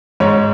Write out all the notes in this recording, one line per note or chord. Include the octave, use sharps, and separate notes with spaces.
G#2 C#5